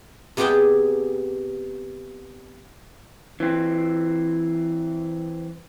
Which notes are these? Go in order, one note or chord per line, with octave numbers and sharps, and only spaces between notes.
C3 B3 G4 G#4 G5 A5
E3 C4